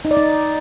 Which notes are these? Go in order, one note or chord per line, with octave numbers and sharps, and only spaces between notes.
D#4
D5
D#4